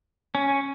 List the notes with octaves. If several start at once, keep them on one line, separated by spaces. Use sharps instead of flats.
C#4